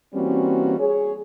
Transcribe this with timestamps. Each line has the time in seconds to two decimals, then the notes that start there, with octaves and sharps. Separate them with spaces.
0.14 E3 G3 A#3 C4 C#4 F#4
0.79 G#4 C#5